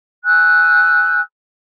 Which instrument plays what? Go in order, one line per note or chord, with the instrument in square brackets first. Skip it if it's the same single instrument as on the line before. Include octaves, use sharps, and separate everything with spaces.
[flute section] G#5 E6 F#6 G6